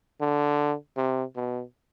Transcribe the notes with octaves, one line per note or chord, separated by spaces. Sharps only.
D3
C3
B2